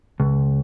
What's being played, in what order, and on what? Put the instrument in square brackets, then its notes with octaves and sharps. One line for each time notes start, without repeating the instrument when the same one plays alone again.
[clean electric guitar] C#2